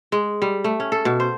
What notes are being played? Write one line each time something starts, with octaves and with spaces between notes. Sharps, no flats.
G#3
G3
A3
C#4
A4
B2
C5